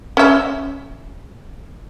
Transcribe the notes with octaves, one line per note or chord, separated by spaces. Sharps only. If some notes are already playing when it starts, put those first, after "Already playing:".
C#4 E5